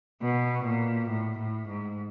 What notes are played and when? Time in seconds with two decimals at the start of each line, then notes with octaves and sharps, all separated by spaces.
0.21 B2
0.65 A#2
1.09 A2
1.39 A2
1.68 G#2